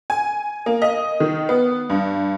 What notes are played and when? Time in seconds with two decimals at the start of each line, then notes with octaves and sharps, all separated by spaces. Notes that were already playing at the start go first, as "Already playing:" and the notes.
0.10 G#5
0.66 A#3
0.82 D#5
1.20 D#3
1.49 B3
1.90 G2